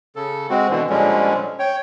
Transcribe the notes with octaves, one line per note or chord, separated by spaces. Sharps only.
C#3 A4
G#3 C4 F#4
B2 D3 E3
A#2 D3 F3 G3 G#3 C#4
C#5 G5